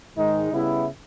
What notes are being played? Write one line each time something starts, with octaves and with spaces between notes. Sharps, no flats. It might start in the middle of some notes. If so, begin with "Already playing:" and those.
G#2 D#3 G#3 D#4
C#3 G3 B3 E4